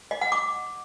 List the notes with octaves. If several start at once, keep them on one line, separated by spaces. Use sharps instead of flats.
D#5
F#5
D6